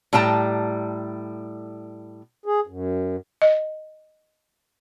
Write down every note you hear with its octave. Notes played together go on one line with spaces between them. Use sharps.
A2 G3 G5 A5 A#5
G#4
F#2
D#5